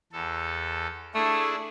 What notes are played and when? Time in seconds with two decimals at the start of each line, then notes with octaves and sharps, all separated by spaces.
0.12 E2 A4
1.15 A3 D4 E4 G#4